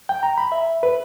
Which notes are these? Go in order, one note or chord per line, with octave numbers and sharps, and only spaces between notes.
G5
A#5
B5
E5
B4